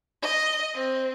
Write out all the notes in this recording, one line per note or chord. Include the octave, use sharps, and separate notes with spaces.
D#5
C4